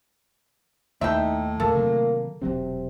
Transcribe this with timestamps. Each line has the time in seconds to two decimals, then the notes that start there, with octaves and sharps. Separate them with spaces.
1.01 D#2 A2 D#4 E5 G5
1.60 E2 A#2 G#3 A#3 A4
1.75 C3 D#3 F#3
2.42 E1 C3 F#3 C4